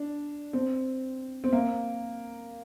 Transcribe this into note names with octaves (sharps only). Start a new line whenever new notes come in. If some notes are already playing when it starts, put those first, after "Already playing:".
Already playing: D4
C4
C4
A#3